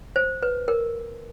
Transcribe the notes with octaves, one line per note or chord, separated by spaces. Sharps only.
C5
B4
A#4